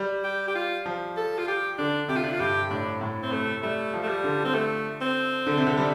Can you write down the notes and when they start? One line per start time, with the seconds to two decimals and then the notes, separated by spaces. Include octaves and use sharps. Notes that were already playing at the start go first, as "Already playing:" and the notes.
Already playing: G3
0.24 G4
0.48 G4
0.55 F4
0.86 F3
1.17 A4
1.39 F4
1.48 G4
1.78 D3 D4
2.08 C3 G4
2.16 F4
2.24 D4
2.32 F4
2.40 G2 G4
2.71 A2 D4
3.01 A2
3.23 C4
3.31 C3 A3
3.63 G3 A3
3.94 F3
4.04 A3
4.08 G3
4.24 D3
4.45 C4
4.55 A3
5.02 C4
5.47 D3
5.57 C3
5.67 D3
5.78 G3